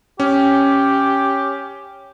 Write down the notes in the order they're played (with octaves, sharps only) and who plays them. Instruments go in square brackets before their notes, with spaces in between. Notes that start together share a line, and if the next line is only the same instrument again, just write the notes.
[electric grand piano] C#4 [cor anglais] G4